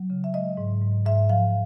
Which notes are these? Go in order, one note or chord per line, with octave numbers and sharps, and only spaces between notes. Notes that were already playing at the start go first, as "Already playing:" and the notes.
Already playing: F#3
C#3
E5
G#3 D#5
G#2
G#2
G#2 E5
F3 F5